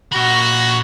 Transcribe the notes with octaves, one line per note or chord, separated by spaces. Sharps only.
A#2 F#4 B5 A#6